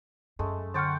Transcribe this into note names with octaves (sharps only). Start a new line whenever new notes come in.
F#2 G#3 A3
D3 F#5 G5 A5 C6 C#6 F6 C#7